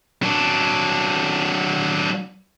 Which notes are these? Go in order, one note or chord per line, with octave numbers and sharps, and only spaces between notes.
F#3 D4